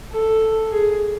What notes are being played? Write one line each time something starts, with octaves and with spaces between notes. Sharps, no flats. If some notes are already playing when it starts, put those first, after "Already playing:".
A4
G#4